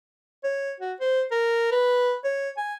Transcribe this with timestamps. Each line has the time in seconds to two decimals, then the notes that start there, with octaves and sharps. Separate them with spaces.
0.44 C#5
0.80 F#4
1.00 C5
1.31 A#4
1.72 B4
2.24 C#5
2.57 G#5